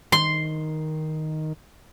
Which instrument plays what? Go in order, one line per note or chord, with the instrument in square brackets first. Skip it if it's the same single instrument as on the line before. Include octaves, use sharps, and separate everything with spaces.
[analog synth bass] D#3 [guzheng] C6